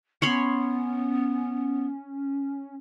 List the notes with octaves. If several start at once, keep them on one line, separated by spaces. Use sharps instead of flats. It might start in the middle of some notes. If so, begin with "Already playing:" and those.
B3 C#4 C#5 B5 C6